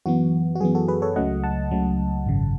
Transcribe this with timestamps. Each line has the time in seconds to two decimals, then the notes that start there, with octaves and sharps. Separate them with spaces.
0.06 F#2 E3 B3 F#4
0.55 F#4
0.60 F#2 E3 B3 G#4
0.75 F#4 A4
0.88 G#4 B4
1.02 A4 C#5
1.16 C#2 C#3 F#3 A3 D#5 F#5
1.44 F#5 A5
1.71 C#2 C#3 F#3 A3
2.26 G#1 F#2 C#3